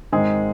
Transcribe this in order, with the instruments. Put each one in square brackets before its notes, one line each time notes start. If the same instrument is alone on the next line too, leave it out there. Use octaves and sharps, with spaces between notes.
[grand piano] G#2 D#3 G#3 C4 G#4